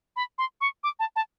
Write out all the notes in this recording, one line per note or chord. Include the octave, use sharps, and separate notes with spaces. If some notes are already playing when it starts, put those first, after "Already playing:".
B5
C6
C#6
D6
A5
A5